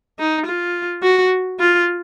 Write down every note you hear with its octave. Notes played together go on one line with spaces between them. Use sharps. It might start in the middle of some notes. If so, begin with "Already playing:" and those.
D#4
F4
F#4
F4